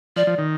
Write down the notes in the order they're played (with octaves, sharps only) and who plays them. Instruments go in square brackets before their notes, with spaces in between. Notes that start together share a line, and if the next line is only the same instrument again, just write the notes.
[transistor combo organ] F3 [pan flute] D5
[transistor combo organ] F3
D#3